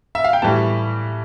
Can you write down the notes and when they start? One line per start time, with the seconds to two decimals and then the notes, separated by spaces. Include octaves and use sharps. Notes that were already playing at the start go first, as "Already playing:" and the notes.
0.15 E5
0.24 F5
0.33 G5
0.42 A2 E3 G3 A5